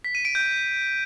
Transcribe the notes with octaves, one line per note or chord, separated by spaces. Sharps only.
B6
D#7
D7
G6